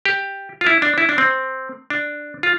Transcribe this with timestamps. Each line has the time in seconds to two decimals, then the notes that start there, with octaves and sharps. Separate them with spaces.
0.06 G4
0.61 F4
0.66 E4
0.82 D4
0.98 E4
1.09 D4
1.18 C4
1.90 D4
2.43 F4